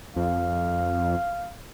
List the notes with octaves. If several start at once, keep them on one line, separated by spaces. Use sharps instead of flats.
F2 F5